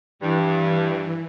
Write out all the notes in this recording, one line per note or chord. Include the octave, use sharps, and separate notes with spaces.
G2 E3